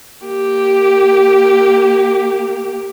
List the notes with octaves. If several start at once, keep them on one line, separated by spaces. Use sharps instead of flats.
A#3 G4